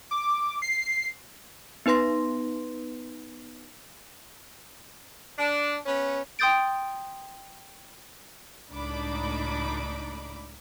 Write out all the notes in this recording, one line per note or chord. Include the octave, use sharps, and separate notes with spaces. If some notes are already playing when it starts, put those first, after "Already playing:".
D6
C7
B3 D#4 B4 C6 A#6
D4
B3 C#4
G5 C6 D#6 G6 A6 D7
C#2 A2 D4 D#4 B5 D6